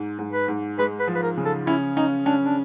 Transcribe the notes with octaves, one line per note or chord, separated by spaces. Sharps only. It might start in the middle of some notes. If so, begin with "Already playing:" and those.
Already playing: G#2
G#2
B4
G#2
G#3 B4
B4
F3
B4
A#4
C#3
A4
C#4 E4
C#4 D#4
C#4 D4
D4